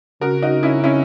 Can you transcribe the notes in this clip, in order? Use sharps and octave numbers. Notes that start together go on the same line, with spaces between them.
C#3 F#4 A#4
D#4 F#4
C#4 E4
C#4 E4